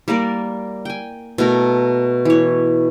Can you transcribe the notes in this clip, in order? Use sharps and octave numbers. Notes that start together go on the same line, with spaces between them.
G3 A#3 A#4 D5
G5 G#5
B2 A3 A#4
E3 C#5